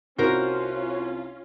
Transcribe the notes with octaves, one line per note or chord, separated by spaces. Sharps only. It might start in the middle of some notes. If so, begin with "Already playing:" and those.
C2 C#4 F4 F#4 A#4 C5